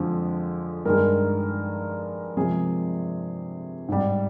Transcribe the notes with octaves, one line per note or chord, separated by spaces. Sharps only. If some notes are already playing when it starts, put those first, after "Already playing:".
Already playing: F2 D3 F3 G#3
G2 D#3 G#3 A#4
C3 F3 G#3 G#4
G#2 G3